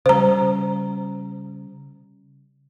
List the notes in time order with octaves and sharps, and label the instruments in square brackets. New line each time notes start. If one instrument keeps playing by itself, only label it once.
[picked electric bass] C#3 G3 [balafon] C5 A#5